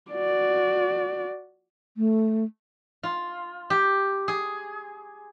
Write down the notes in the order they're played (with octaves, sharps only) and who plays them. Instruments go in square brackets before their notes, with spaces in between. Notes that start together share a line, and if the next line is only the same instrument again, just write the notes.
[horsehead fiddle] F#4 D5
[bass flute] A3
[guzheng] F4
G4
G#4